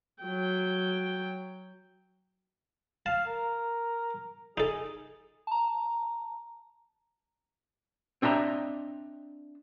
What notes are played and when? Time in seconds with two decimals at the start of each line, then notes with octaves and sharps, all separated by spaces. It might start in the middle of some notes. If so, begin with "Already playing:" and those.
0.23 F#3 G5
3.06 F5 A5
3.27 A#4
4.58 D#4 G#4 A4
5.47 A5 A#5
8.22 C4 D4 D#5 E5 A#5